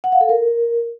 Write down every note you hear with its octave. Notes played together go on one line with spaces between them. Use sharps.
F#5
F5
A4
A#4